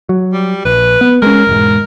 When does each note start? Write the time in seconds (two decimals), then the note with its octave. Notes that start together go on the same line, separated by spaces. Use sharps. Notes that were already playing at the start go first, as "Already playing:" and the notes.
0.09 F#3
0.33 G3
0.65 A#1 B4
1.01 B3
1.22 G#3 C#4 A#4
1.47 E1 G#2